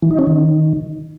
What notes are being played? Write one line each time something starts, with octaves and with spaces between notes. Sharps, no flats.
E3
D#4
C#4
D#3